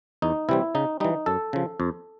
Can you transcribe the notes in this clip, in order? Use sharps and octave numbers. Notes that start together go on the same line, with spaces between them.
E2 D#4
C3 E3 G3 C4 E4
C#3 D#4
E3 G3 D#4
F#2 A4
C#3 F3
F2